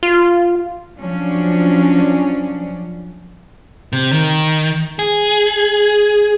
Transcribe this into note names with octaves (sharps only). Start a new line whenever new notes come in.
F4
F3 F#3 C#4 D4
C3
D#3
G#4